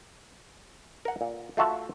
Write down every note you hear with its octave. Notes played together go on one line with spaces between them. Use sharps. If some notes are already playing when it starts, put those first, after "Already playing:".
A#4 F#5
A#2
A3 F4 F#4 E5 A5